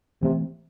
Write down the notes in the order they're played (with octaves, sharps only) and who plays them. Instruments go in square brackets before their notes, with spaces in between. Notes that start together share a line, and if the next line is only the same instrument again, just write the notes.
[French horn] C3 [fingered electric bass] E3 A3 C4